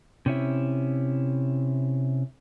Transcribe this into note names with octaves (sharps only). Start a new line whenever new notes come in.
C3 C#4 E4